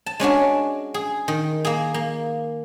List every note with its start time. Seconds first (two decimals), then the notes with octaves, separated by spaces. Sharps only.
0.06 A5
0.20 G#3 C#4 D4 F#4
0.94 G#4
1.28 D#3
1.65 A#3 G#4
1.94 A#3